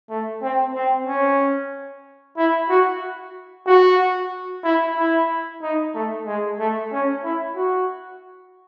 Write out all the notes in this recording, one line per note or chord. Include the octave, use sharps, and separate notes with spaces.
A3
C4
C4
C#4
E4
F#4
F#4
E4
E4
D#4
A3
G#3
A3
C#4
E4
F#4